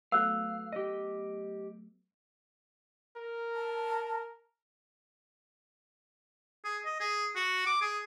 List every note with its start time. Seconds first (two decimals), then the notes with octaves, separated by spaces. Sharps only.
0.12 F#3 A3 B3 F5 E6 F#6
0.73 G4 D#5
3.17 A#4
3.55 A5
6.64 G#4
6.85 D#5
7.00 G#4
7.35 F#4
7.66 D6
7.81 G#4